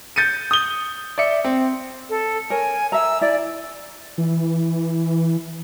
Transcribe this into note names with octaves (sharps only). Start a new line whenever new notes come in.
G6 A6 C#7 D#7
D#6 G7
D5 E5 C#7
C4
A4
A#4 C#5 G#5
E5 A#5 E6
E4 D5
E3